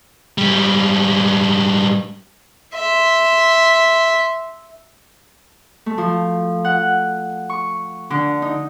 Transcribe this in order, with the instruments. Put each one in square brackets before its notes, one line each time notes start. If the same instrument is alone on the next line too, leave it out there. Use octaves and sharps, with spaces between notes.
[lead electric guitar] G#2 G3
[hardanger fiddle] E5 C6
[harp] A3
F3
F#5
C#6
D3
D#4